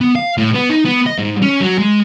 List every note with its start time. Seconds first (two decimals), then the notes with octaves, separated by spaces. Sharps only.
0.01 B3
0.15 F5
0.38 A2
0.55 B3
0.70 D#4
0.85 B3
1.07 D#5
1.19 G#2
1.42 C#4
1.61 F#3
1.78 G#3